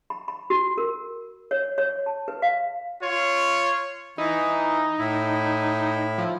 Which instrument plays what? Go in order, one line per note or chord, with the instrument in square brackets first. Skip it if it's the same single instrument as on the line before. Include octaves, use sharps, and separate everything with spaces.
[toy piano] B5
B5
F#4
A#4
C#5
C#5
A5
B4
F5
[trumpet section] F4 C#5
[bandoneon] E3 E4 [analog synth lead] D#4
[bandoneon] A2 E4
[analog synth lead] F3